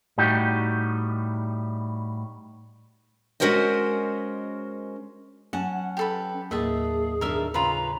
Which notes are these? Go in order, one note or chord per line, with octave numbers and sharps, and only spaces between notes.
A2 G3 D#4 F#4 G4
G#3 C#4 F#4 A#4 C5 D#5
F#3 C#4 F#5 A5
G4 A4 B4
D#2 A2 A#3 G#4 D#5 E5 A5
D#3 D4 A4 A#4 E5 F5
C#3 F4 B4 A#5